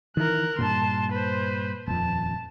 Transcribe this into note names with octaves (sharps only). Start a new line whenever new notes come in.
D#3 E3 A#4 F#6
G2 A#2 A5 C6
B4 C5
D#1 F2 A5